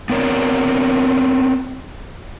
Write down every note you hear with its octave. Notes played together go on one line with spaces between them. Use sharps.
B3 C4 A#4 C#5 D5